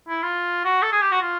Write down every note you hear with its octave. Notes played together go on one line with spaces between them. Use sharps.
E4
F4
F#4
A4
G#4
G4
F#4
F4